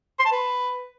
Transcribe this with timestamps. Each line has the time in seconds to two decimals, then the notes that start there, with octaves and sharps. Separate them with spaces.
0.19 C6
0.26 A5
0.32 B4